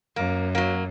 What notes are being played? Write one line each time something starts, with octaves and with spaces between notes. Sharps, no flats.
F#2 A#3
F#3 A#3